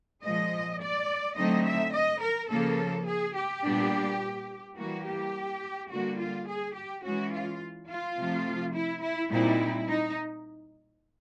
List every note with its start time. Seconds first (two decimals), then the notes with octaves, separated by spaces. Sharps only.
0.23 A#2 F3 G#3 D#5
0.81 D5
1.37 D3 F#3 A3 C4 D#4 D#5
1.66 E5
1.93 D#5
2.21 A#4
2.50 C#3 F3 A#3 A4
3.07 G#4
3.35 G4
3.64 A#2 G3 B3 D4
4.77 E3 G3 A#3 F#4
5.05 G4
5.90 D3 G3 A#3 F#4
6.19 F4
6.48 G#4
6.75 G4
7.04 E3 G#3 C#4 F#4
7.33 F4
7.89 F4
8.17 C3 F3 A3
8.74 E4
9.03 E4
9.31 A#2 G3 C4 D#4 E4
9.88 D#4